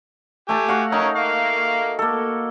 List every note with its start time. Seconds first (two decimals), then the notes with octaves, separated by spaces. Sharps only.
0.49 A3 G4 G#5 A5
0.68 F#4 F5 F#5
0.92 C#4 D#4 A#4 C#5
1.16 A#3 F5
1.99 A#3 A4